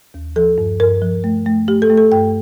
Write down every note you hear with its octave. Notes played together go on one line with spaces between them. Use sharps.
D#2
F3 A4
G2
G2 A#4
F3
A3
A3
A3 G4
A4
A3
A4
G2 G5